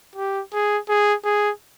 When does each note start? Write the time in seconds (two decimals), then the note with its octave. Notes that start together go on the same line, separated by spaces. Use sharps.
0.16 G4
0.53 G#4
0.89 G#4
1.25 G#4